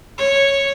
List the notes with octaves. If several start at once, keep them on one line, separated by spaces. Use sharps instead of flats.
C#5